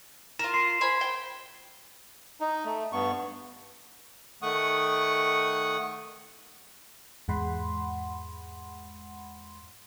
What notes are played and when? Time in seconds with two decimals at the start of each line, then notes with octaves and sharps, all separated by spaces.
0.39 F4 A#4 E7
0.54 C6 C7
0.81 C5 G#5 B5
1.01 G5
2.41 D#4
2.65 A3
2.93 G2 B3 C#6
4.42 D#3 A3 F#5 C#6 D#6
7.28 E2 G#2 G#3 F#5 B5 C6